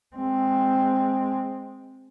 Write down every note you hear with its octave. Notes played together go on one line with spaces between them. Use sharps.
G#3 C4